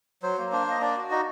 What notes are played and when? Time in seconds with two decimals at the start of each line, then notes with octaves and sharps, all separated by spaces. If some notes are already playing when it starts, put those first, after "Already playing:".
0.23 F#3 C5
0.38 A#3
0.52 D4 C5
0.67 A#3 D#5
0.81 D4 D5
0.97 F#4
1.11 D#4 D#5